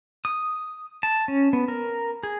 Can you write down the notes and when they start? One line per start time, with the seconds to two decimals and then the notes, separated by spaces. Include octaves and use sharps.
0.25 D#6
1.03 A5
1.28 C#4
1.53 B3
1.68 A#4
2.23 G#4